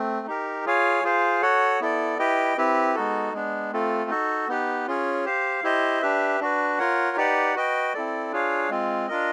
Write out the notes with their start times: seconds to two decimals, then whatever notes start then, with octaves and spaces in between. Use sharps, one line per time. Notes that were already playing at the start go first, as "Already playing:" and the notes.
Already playing: A3 C4
0.27 D#4 G4 A#4
0.66 F4 G#4 C#5 F5 G#5
1.03 F4 G#4 C5 F5
1.42 F#4 A4 C#5 F#5
1.80 B3 E4 A4 D5
2.19 E4 G4 B4 D#5 G5
2.57 C4 E4 G4 B4
2.95 G#3 B3 D#4 F#4 A4
3.33 G#3 B3 D4
3.72 A3 C4 F4 A4
4.10 D#4 F#4 A4
4.48 B3 D#4 G4 B4
4.87 C#4 F4 G#4 C#5
5.25 G4 C5 F5
5.63 E4 G4 C5 D#5
6.02 D4 G4 B4 E5
6.41 D4 F#4 B4
6.78 F4 A#4 C#5 F#5
7.17 D#4 G4 B4 D5 F#5
7.55 F#4 B4 D#5 G5
7.94 C4 E4 A4 D5
8.32 D4 F4 G#4 C#5 F5
8.69 G#3 C4 F4
9.08 D4 F4 A#4 D#5